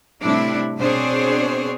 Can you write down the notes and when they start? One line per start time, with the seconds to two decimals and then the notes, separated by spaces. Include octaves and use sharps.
0.22 A2 C3 G3 C4 D4 E4
0.79 B2 C4 D4 G#4 C5 C#5